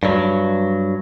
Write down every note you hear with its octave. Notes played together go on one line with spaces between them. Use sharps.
G2 F#3